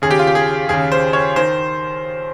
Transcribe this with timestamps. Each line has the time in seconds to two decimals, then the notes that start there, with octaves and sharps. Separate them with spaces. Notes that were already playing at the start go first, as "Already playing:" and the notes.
0.02 D#2 C#3 G#4
0.11 G4
0.19 F4
0.27 G4
0.35 G#4
0.69 D#2 C#3 G#4
0.92 C5
1.13 C#5
1.36 D#3 C5